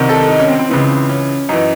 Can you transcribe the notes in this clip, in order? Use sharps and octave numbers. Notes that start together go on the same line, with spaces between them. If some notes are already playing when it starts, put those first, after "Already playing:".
Already playing: C2 C3 D#3
A4
D#4
C#4
C4
C4
C#2 C#3 E3
C#4
F#2 E3 D#4